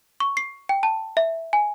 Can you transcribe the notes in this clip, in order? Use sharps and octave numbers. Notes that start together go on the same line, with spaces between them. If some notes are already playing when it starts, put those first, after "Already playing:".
C#6
C7
G5
A5
E5
G#5